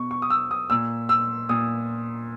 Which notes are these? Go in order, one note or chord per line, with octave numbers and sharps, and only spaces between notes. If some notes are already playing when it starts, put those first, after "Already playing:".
Already playing: B2 C#6
C#6
D#6
E6
D#6
A#2 E6
E6
A#2 D#6